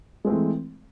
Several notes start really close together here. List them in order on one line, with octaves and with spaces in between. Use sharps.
G#3 C4 A3 E3